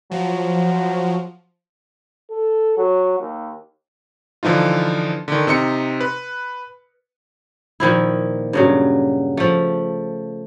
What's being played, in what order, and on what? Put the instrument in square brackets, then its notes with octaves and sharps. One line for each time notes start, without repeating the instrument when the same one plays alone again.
[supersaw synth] F3 [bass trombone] F#3
[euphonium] A4
F#3
D#2
[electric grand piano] D3 E3 F3 D#4 F4
D3 D#3
C3 D#4 C6 C#7
B4
[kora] A#2 D#3 F3 E4
G2 C#3 F#3
F3 A3